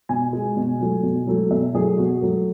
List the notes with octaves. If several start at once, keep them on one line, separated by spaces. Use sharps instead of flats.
B2 G#5
G#3
B2
F#3 A3
B2
F#3 A3
B2 E5
F#3 A3 G#4
B2 F#4
F#3 A3 A4